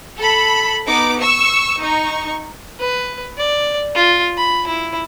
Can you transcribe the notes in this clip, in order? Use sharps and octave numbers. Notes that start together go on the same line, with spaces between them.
A4 B5
B3 D#4 D6
C#6 E6
D#4 C#6
B4
D5
F4
B5
E4